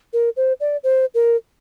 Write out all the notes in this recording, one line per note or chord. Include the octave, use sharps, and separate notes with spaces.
A#4
C5
D5
C5
A#4